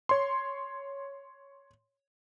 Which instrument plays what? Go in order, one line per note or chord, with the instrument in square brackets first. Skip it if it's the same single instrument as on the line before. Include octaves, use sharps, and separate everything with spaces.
[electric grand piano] C#5 C6